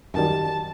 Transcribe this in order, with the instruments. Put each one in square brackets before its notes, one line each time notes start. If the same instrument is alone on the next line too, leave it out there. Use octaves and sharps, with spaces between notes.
[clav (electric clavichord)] F#2 D#3 G3 [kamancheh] A5